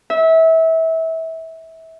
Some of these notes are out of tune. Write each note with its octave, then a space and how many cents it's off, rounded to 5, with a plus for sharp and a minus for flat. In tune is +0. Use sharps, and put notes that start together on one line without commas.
E5 -25